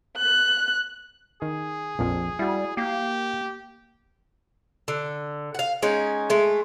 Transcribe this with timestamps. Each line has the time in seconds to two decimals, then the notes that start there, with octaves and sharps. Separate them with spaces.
0.18 F#6
1.42 D#3 G#4
1.99 A#1 F2 F3
2.39 G3 E4 F#4
2.77 A#3 G4
4.88 D3
5.55 F5 F#5
5.82 G#3 C#4 D#4
6.30 G#3 A3